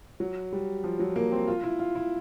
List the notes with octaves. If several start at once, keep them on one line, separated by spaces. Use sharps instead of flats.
F#3
G3
F3
F#3
A#3
C4
F4
E4
F4
E4